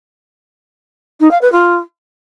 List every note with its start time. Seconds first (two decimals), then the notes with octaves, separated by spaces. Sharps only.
1.20 D#4
1.30 F5
1.41 B4
1.52 F4